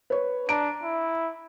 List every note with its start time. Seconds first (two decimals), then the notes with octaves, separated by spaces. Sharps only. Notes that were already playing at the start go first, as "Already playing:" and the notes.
0.10 B4 C#5
0.49 D4 A#5 D7
0.84 E4